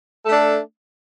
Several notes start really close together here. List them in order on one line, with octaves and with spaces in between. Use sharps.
A4 A3 D4